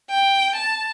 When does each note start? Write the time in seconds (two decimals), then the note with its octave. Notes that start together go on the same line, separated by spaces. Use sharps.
0.11 G5
0.56 A5